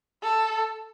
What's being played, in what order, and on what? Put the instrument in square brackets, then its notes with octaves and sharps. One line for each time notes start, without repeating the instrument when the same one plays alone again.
[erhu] A4